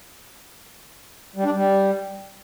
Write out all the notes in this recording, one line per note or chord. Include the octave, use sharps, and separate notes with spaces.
G3
D4
G3